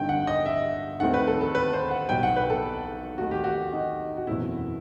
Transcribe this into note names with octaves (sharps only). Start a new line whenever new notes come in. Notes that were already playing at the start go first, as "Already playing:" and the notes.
Already playing: G1 G2 D#3 G5
F#5
D#5
E5
D#2 D#3 A3 C4 F#5
B4
A4
A4
B4
C5
F#5
B1 B2 G3 B3 G5
F#5
B4
A4
D#2 D#3 A3 F#4
G4
F#4
D#4
F#4
F#1 E2 B2 A3 C4 E4